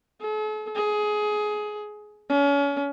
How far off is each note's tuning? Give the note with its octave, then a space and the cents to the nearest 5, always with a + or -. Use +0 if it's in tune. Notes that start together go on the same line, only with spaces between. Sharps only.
A4 -45
G#4 +20
C#4 +35